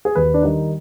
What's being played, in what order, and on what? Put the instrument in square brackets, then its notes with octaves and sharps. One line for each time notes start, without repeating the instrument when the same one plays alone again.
[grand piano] G#4
D#2 B4
D4
D#3 G3 D#4